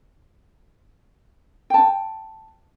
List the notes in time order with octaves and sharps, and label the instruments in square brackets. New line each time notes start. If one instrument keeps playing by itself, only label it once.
[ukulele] G5 A5